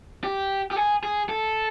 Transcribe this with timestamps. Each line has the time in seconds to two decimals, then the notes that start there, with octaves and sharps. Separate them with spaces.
0.24 G4
0.71 G4
0.76 G#4
1.03 G#4
1.29 A4